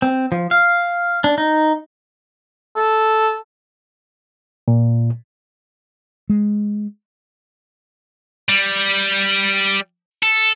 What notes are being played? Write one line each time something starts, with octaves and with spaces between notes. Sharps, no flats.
C4
F3
F5
D4
D#4
A4
A#2
G#3
G3
A4